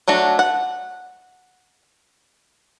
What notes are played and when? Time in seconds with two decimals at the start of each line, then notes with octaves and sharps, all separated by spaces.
0.08 F#3 A3 D4 F#4
0.39 F#5